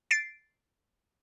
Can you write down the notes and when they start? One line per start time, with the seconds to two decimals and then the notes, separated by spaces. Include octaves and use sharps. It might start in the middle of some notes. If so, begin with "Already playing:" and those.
0.11 A6 C7 D7